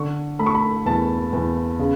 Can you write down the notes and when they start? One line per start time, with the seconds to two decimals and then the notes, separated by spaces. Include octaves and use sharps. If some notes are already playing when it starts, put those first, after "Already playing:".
Already playing: D3 C#6
0.39 A3 B5
0.46 C#6
0.55 B5
0.86 E2 A5
1.33 E2
1.79 C#3